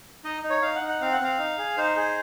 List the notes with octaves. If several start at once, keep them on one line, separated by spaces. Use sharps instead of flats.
D#4 D#5
D#4
C#5
D#4 F5
F#5
D#4
F#5
C4 F5
F#5
C4 F5
D#4
G#4
D#4 C5
G#4